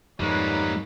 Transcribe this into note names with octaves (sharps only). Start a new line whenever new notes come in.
F2 G#2 G3 A#3 D#4 G#4 B4 C#5